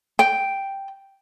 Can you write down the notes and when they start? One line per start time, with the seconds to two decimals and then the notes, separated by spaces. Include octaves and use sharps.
0.19 G5